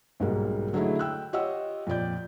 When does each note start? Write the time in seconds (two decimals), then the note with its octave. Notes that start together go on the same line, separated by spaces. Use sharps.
0.20 B1 G#2 G3 G#3 A#3
0.73 D3 F#3 G#3 A3 D#4 E4
0.99 G5 E6 F#6
1.33 F4 G4 C#5 D#5 F#5 E6
1.87 F2 A#2 D5 G6